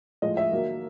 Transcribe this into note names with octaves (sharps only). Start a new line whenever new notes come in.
A2 F3 G#3 D#5
E5
D#3 F#3 A#3